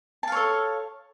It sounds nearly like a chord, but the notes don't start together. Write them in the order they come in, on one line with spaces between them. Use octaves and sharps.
A5 F5 C#5 A4